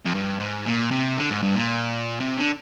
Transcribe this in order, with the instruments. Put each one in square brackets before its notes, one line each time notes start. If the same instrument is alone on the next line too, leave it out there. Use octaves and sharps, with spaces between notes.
[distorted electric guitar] F2
G2
G#2
A#2
C3
D3
G#2
G2
A#2
C3
D3